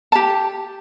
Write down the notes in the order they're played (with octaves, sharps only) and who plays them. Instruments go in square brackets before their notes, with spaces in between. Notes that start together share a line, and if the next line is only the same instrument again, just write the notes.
[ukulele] G4 A5